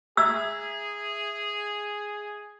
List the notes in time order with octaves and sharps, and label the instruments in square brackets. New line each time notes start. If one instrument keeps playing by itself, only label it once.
[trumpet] G#4 [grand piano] E5 A#5 G#6 [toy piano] E6